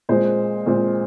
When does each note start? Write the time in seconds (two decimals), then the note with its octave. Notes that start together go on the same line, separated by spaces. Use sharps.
0.09 A#2 G#3 C4 C5
0.66 A#2 G#3 C4